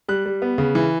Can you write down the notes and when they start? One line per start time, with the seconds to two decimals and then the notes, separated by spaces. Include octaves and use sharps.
0.08 G3 F#6
0.26 G3
0.42 B3
0.58 C#3
0.75 E3